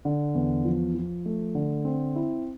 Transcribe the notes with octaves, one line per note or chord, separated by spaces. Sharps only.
D3
E2
F3
F3
A3
D3
C4
E4